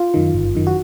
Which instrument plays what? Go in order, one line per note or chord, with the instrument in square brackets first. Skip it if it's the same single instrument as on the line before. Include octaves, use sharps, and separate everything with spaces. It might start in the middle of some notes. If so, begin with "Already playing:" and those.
Already playing: [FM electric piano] F4
F#2 D#3
G1
F#2 D#3
F#4